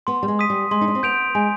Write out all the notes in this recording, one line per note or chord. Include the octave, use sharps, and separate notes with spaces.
B3 C6
G3
G#3
D#6 B6 D#7
G3
G#3 C6
D#4
D4
C4
B3 G6 D7 F7
G#3 G#5